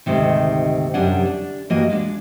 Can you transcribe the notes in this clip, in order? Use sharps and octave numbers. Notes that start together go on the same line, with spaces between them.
D2 G#2 C3 D#3
F#2 C3 G3 D4 G#4 F#5
D4
G2 E3 A#3 F#4 D#5
G#3 D4